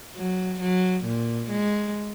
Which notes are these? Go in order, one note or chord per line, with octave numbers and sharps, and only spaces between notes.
F#3
F#3
A#2
G#3